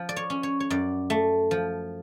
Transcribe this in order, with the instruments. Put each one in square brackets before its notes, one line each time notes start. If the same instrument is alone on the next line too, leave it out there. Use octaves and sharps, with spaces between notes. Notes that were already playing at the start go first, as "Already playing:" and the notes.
Already playing: [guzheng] F3
D5
C#5
C#4
C#5
C#5
F#2 D5
A3
F3